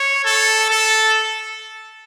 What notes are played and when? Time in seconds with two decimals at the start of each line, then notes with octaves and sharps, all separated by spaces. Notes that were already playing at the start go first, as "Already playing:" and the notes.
Already playing: C#5
0.24 A4
0.70 A4